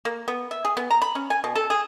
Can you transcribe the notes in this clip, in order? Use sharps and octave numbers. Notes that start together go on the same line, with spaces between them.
A#3
B3
E5
G#4
B3
A#5
B5
C#4
G#5
B2
A4
G#4